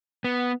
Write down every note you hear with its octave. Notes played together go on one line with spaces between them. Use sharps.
B3